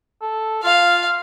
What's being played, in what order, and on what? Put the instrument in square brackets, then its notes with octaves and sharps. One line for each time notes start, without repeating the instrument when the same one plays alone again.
[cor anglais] A4
[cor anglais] F4 [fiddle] F5